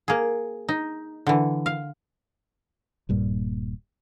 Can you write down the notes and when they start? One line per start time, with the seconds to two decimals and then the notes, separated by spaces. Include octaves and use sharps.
0.08 A#3 G#4
0.69 D#4
1.27 D3 E3
1.66 F5
3.09 D#1 G2 A#2